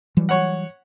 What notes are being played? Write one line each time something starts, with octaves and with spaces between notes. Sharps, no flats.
E3 F#3 G3
C#5 F#5